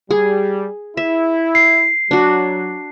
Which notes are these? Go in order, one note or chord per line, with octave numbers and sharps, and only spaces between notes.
G3 G#4
E4 E5
C7
F#3 D4 F#4